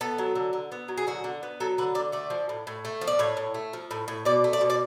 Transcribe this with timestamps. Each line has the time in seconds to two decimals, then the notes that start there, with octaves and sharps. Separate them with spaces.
0.01 B3 A4
0.18 F#3
0.35 D3
0.53 D3
0.72 B3
0.88 F#3
0.97 G#4
1.07 D3 F#4
1.24 D3
1.43 B3
1.60 F#3 A4
1.78 D3 B4
1.95 D3 D5
2.12 A3 D5
2.30 F3
2.49 A2
2.67 A2
2.85 A3
3.01 F3
3.07 D5
3.19 A2 C#5
3.37 A2
3.54 A3
3.73 F3
3.91 A2
4.08 A2
4.25 B2 D5
4.44 A3
4.53 D5
4.61 B2
4.70 D5